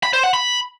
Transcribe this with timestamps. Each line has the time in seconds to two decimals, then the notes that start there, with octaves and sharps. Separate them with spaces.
0.03 B5
0.13 C5
0.24 F#5
0.34 B5